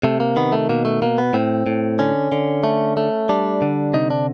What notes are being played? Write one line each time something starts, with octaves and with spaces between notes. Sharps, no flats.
C3 A3
A#3
D#3 B3
A3
B2 A#3
A3
B2 A#3
B3
A2 C4
A2
D3 C#4
D3
A3
A3
G3 D4
D3
C3 D#4
D4